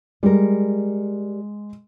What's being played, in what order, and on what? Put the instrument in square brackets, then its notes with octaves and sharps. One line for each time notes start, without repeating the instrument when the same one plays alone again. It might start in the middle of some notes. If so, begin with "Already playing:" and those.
[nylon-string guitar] G3 A#4 [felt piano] G#3